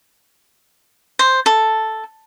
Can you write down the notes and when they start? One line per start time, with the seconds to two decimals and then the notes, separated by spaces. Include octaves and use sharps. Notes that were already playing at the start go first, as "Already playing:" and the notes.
1.19 C5
1.46 A4